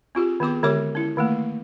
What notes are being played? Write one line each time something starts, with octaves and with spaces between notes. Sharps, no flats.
C4 F4 G4 G#4
D#3 B3 G#4 D6
D3 G#3 G4 C#5 D6
C#4 E4
D#3 A3 A#3